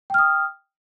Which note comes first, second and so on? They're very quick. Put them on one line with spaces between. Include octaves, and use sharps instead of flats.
G5 F6 D#6